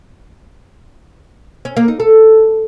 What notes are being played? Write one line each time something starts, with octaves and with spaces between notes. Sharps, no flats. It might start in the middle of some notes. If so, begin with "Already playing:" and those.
C#4
A#3
D#4
A4